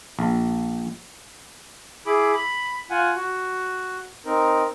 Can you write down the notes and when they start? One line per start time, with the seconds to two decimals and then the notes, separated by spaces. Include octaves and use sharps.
0.19 A#1
2.06 E4 G#4 B5 D6
2.35 B5
2.90 F4 F#5 G#5
3.16 F#4
4.25 C4 D#4 A#4